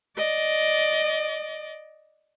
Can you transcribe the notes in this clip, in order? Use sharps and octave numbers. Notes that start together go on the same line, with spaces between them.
D5 D#5